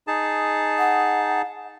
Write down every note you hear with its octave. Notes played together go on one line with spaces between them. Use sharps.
D#4 G#4 A5
F#5